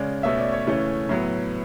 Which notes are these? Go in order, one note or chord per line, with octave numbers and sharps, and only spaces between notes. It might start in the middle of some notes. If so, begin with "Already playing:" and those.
Already playing: C#3 G#3 C#4 D5
B2 A3 C#4 E5
D5
C#5
C#3 E3 A3 C#4
A2 F#3 B3